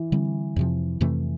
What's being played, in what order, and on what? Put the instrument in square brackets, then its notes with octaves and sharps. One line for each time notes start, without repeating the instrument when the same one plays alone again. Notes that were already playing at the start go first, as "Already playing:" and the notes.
Already playing: [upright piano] E3
[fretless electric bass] D3 G3 C4
F2 C3 F3
F2 C3 E3 A3